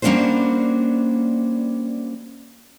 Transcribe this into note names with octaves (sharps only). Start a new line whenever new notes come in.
G3 A#3 C#4 D4 F#4 C5